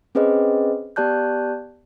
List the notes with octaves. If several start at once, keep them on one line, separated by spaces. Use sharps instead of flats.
C4 C#4 G#4 B4 C5 D#5
B3 G4 D5 A5 F#6 G6